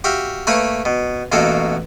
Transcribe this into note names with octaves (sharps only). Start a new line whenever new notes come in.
F#4 G4 E5 F5
A3 A#3 B4 C#5 B5
B2
A1 B2 A#3 F#4 A4